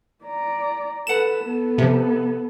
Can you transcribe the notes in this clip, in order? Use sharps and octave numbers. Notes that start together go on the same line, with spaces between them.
D5 A#5
A4 B4 F#5 E7
B3 A4
C3 F3